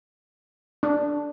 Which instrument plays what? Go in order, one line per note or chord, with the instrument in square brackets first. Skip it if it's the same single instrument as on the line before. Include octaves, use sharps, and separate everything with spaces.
[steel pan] D4